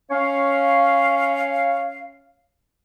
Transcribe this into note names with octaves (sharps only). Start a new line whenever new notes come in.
C#4 C#5 F5